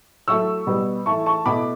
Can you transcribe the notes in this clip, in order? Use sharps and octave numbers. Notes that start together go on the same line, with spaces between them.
F#3 A3 E4 C#6 E6
B2 G3 B3
E3 A3 E4 A5 C#6
A5 C#6
B2 A3 E4 B5 D6